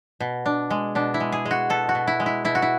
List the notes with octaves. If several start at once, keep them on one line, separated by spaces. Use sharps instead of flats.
B2
D4
G#3
B2 D4
E4
G#3
G#4
G#3
F#4
B2 A4
F#4
B2
E4
G#3
E4
B2 E4
F#4
E4